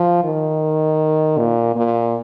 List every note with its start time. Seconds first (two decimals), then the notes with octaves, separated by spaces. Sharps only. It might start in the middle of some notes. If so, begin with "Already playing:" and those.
Already playing: F3
0.24 D#3
1.38 A#2
1.76 A#2